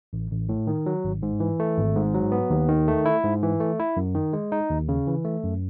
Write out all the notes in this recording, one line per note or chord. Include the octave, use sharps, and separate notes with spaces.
A1
A1
A2
D#3
F#3
G#1
G#2
E3
A3
G#1
G#2
F#3
B3
D#2
D#3
A3
E4
G#2
E3
A3
E4
F#2
D#3
G#3
D#4
D#2
C#3
E3
A3
F#2